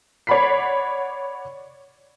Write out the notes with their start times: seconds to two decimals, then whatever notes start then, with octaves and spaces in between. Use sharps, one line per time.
0.27 C#5 D5 F#5 B5 B6 C7